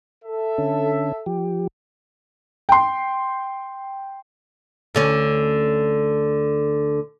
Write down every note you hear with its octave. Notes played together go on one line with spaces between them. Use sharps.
A4 E5
D3 C#4
F3 G4
G5 C6
D2 D3 C#4